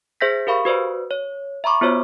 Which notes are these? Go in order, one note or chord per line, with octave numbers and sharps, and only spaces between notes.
G#4 C5 E5 G6 A#6 B6
G4 A#4 F5 B5 C#6
F#4 B4 C5 D5
C#5
E5 A#5 B5 C#6 D6
B3 F4 F#4 C5 C#5 F6